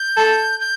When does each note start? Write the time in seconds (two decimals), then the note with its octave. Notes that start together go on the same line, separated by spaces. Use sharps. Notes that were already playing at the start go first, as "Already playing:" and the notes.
Already playing: G6
0.16 A4
0.60 G6